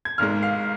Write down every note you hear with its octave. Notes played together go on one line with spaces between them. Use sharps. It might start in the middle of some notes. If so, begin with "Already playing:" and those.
G#6
G#1 G#2 G#3 F6
F5